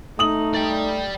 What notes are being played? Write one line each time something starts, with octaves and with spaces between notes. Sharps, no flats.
A3 D#4 D#6 F#7
D5 G5